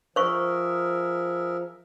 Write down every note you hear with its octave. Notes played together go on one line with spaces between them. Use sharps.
F3 G#4 A#4 C5 E5 C#6